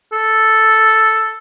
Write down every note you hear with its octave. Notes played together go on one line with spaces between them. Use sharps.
A4